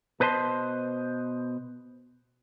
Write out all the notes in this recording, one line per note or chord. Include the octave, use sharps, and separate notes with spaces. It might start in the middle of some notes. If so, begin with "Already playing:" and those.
B2 B4 C5 D#5 A5 C6